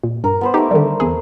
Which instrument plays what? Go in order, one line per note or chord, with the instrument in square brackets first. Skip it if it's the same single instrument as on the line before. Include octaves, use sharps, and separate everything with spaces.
[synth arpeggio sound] A#2
[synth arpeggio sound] G2 [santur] A#4
[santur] B3 B4 C5
[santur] A3 A#4 [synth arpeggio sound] D#4 G4
[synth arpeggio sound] D3 D#3 G3
E2 G#4